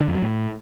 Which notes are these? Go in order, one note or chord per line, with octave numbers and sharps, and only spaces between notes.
D3
F2
F#3
A2